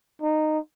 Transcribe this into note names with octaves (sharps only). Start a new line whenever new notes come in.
D#4